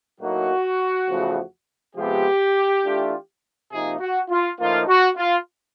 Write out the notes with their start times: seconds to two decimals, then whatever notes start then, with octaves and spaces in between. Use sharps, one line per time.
0.21 A2 F#3 A#3 D#4 F#4
1.09 E2 C#3 F3 A3
1.96 C3 F3 G#3 B3 G4
2.84 E3 A3 D4 F4
3.71 C3 F3 A#3 D#4 G#4
4.00 F#4
4.29 F4
4.59 A2 F3 A#3 D#4 F4
4.88 F#4
5.17 F4